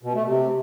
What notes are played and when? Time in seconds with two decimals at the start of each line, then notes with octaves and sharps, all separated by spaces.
0.03 B2
0.15 A3
0.26 C3